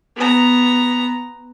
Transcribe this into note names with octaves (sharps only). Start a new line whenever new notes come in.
B3 A#5